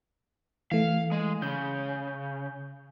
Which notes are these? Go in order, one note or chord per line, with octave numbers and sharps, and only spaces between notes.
E3 A3 F5
G#3
C#3 G6